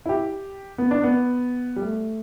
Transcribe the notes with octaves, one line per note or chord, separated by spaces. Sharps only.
E4
G4
B3
D4
B3
G3
A3